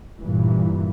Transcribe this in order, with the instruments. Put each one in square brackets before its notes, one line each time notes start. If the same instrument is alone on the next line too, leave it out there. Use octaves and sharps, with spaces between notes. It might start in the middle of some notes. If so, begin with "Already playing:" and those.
[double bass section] G2 A#2 E3